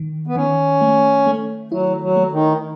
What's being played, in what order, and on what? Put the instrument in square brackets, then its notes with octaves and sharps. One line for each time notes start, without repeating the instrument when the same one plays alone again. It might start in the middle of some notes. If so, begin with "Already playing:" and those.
Already playing: [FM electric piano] D#3
[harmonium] B3
[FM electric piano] D#3 [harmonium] C#4
[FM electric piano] A3
A3
[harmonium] F#3 [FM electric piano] E4
[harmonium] F#3
[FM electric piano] A3
[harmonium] D#3